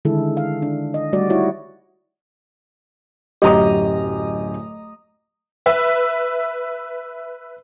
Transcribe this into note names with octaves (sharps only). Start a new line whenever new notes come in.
D3 D#3 G#3 E4 G#4 A4
F5
D4
D#5
G3 A3 F#4 D5
D#4 E4 F#4 C#5 D#5
D1 F#2 G4 D#5 A#5 D#6
B4 E5